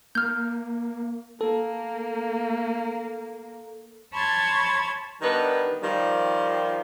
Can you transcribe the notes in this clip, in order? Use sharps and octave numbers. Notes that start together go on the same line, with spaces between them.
A#3 F6 G6
A#3 A4
C#5 A5 B5 C6 G#6 A6
D#3 G3 B3 D4 D#4
D#3 F3 G3